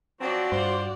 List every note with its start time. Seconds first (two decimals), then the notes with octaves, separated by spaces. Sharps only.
0.20 F3 F#3 C4 F#4 D5 F#5
0.52 G2 F4 C5